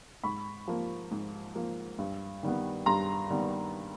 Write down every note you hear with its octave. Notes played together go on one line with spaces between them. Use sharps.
G#2 B5 C#6
F3 A#3
G#2
F3 A#3
G2
D#3 G3 B3
G2 A#5 C6
D#3 G3 B3